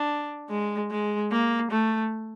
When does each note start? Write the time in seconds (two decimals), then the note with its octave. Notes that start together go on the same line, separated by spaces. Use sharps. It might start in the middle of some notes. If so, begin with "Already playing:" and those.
Already playing: D4
0.49 G#3
0.91 G#3
1.31 A#3
1.71 A3